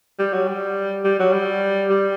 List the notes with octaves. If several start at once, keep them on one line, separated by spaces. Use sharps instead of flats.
G3
F#3
G3
G3
F#3
G3
G3